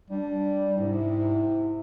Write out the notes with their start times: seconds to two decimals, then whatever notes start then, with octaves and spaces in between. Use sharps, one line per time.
0.10 G3 D4
0.78 G#2 C3 E4